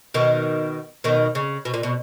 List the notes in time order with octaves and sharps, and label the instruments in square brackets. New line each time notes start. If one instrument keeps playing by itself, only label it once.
[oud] B2 D#3
B2 D#3
C#3
B2
A#2
B2